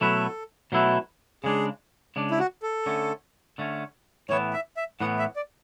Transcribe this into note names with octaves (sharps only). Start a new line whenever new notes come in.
B2 F#3 A3 E4 A4 B4
B2 F#3 A3 E4 B4
C#3 G#3 D4 G#4
C#3 G#3 D4
E4
F#4
A4
D3 A3 C#4
D3 A3 C#4
A2 E3 B3 C#5
E5
E5
A2 E3 B3 F#5
E5
D5